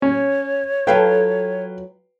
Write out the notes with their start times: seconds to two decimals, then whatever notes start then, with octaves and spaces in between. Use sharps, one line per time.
0.02 C#4 C#5
0.87 F#3 F4 A4 B4 F5 G5